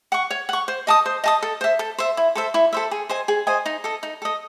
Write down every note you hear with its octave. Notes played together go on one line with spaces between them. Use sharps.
F#5 C#6
C#5
F#5 C#6
C5
D#5 A5 D#6
C5
D#5 A5 D#6
A4
C5 E5
A4
C5 E5
E4
A4 C5 E5
E4
A4 C5 E5
G#4
C5 D#5 G#5
G#4
C5 D#5 G#5
D#4
A4 D#5
D#4
A4 D#5